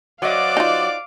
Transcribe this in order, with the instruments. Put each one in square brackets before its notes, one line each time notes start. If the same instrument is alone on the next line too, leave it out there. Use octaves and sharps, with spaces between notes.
[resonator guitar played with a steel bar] F#3 D#5 [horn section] F#4 C5 D5 [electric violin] F5 D6
[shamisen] D#4 F4